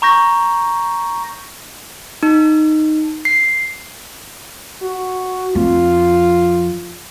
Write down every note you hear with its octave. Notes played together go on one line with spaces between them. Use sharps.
A#5 C#6 G6 A#6
D#4
C7
F#4
F2 F4